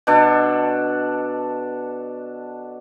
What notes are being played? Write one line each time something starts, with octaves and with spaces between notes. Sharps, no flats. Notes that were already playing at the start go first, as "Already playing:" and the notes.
B2 D4 A4